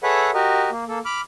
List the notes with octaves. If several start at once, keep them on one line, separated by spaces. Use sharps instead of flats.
G#4 A4 B4 C#5 E5 F#5
F#4 G4 A#4 D#5
A#3
A#3 A4
B5 D6 F6